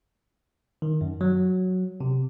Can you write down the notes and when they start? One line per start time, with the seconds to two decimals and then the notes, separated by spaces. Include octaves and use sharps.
0.82 D#3
1.01 F#2
1.21 F#3
2.01 C3